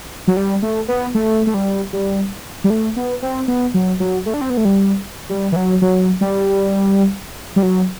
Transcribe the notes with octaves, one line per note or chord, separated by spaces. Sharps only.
F#3
G3
A3
B3
A3
A3
G3
G3
G3
A3
B3
C4
B3
F#3
F#3
A3
D4
C4
B3
A3
G3
G3
E3
F#3
F#3
G3
G3
F#3